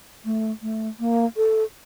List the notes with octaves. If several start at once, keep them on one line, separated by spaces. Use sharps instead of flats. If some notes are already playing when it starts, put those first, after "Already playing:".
A3
A3
A#3
A4